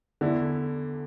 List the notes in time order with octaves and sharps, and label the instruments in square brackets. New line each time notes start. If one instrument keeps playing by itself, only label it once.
[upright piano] E2 D3 A3 E4